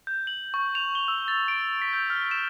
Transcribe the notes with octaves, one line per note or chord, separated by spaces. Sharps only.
G6
F#7
C#6
F7
G7
E6
A6
D7
B6
G6
F6
E7